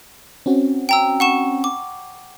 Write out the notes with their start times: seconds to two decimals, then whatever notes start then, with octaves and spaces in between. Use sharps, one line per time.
0.46 C4 C#4 F#4
0.89 G5 A#5 E6
1.20 F#5 C#6 E7
1.64 D6